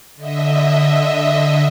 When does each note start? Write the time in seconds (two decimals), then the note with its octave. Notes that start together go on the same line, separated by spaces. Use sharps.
0.16 D3 D#5 E5